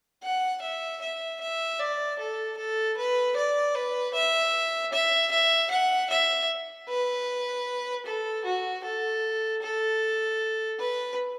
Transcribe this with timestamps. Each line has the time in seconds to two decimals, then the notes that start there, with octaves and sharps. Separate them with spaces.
0.23 F#5
0.62 E5
1.02 E5
1.41 E5
1.79 D5
2.19 A4
2.57 A4
2.97 B4
3.36 D5
3.75 B4
4.14 E5
4.93 E5
5.31 E5
5.71 F#5
6.10 E5
6.89 B4
8.06 A4
8.45 F#4
8.84 A4
9.62 A4
10.79 B4